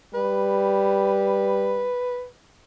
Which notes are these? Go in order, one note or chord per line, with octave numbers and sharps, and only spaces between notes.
G3 B4